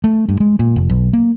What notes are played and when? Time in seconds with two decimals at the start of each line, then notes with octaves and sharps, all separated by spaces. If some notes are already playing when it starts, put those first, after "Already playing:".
0.04 A3
0.29 G2
0.40 G#3
0.59 A#2
0.76 F1
0.89 B1
1.13 A#3